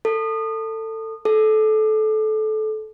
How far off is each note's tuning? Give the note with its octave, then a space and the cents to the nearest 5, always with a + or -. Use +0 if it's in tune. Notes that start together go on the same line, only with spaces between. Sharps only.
A4 +20
A4 -25